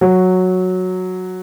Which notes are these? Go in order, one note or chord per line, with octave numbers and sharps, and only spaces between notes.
F#3